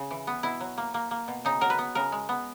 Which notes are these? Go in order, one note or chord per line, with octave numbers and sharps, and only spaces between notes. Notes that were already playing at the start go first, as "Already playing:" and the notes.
Already playing: C#3
E3
B3
B2 E4
F#3
A#3
A#3
A#3
B2
C#3 D#4
F#3 A#4
B4
B3
C#3 A#4
G#3
B3